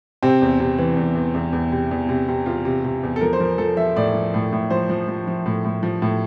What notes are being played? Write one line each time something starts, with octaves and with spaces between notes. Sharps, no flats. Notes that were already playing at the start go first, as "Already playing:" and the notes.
C3 C4
E2
C3
E3
E2
E2
E2
E2
C3
E2
C3
C3
E2 F4
C3
C3
E2
A4
F3 A#4
C5
F3 A#4
F3 A4
F3 E5
A2 D5
F3
A2
A2
F3 C5
F3
F3
F3
A2
A2
F3
A2